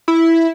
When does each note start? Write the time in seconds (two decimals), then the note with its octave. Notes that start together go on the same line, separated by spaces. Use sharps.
0.08 E4